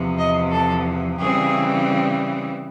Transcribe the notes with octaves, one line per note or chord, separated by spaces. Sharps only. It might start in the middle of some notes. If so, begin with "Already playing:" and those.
Already playing: E2 C3 F3
D#5
A4
C#3 E3 G3 C4 G#4